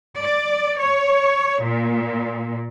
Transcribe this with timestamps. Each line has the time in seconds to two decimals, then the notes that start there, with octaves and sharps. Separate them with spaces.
0.20 D5
0.79 C#5
1.62 A#2